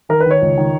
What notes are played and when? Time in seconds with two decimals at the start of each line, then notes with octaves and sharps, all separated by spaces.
0.09 D#3 A#4
0.20 B4
0.26 D#3 C#5
0.42 C#2
0.57 D#3